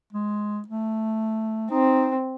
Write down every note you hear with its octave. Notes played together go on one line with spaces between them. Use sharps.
G#3
A3
C4 D#4